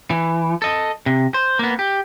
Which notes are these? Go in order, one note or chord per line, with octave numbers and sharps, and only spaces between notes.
E3
A4 D#5
C3
C5
A#3 B3
G4